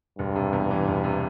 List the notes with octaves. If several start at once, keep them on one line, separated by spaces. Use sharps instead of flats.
E1 G2
C3
E2
E3
E1
C3